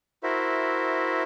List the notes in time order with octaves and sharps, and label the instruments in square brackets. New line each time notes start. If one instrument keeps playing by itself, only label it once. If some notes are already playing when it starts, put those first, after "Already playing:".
[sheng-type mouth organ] E4 F#4 A#4 C5 E5